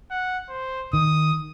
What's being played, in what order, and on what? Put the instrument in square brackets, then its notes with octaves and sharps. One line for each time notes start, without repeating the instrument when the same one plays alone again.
[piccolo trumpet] F#5
C5
[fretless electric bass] D#3 [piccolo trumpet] D#6